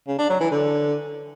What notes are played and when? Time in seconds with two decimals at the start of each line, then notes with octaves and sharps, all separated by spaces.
0.08 C#3
0.19 D4
0.29 F#3
0.40 E3
0.51 D3